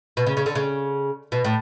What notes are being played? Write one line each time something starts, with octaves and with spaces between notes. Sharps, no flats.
B2
C#3
C#3
D3
C#3
B2
A2